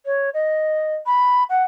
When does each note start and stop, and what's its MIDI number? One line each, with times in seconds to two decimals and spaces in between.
0.05 0.29 73
0.33 0.94 75
1.06 1.43 83
1.49 1.63 78